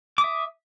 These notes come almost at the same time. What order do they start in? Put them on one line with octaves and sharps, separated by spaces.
D6 D#6 E5